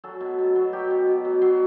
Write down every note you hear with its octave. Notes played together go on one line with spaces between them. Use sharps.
F#3 A4
B2
B2
F#3
F#3 G4
B2
B2
F#3
F#3